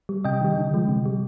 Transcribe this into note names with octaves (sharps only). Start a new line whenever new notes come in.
G3
C3 D#5 G5
D#3 G3
D3
F3 G#3
C3
G3